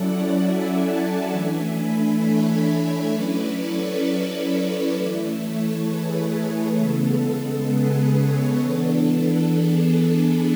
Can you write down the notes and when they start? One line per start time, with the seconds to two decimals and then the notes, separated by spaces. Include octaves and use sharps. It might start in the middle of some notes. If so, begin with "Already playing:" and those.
Already playing: F#3 C#4 E4 A4 D5 F#5
0.37 E5 G#5
0.83 F#5 A5
1.28 E3 A3 D4 E5 G#5
1.75 G#5 B5
2.20 A4 C#5
3.11 F#3 C#4 E4 B4 D5
3.57 A4 C#5
4.95 E3 A3 E4
5.40 A4 C#5
5.86 G#4 B4
6.32 G#4 B4
6.78 C#3 G#3 B3 A4
7.24 A4
7.69 G#4 B4
8.15 A4 C#5
8.61 E3 B3 D4 A4
9.53 G#4